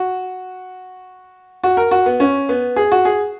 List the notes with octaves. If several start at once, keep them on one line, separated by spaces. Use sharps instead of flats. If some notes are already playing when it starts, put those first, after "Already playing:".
Already playing: F#4
F#4
A#4
F#4
B3
C#4
B3
G#4
F#4
G#4